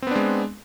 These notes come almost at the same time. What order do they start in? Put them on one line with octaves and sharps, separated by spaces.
C4 B3 D4 G#3